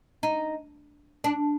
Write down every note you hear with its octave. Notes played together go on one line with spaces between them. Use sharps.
D#4
D4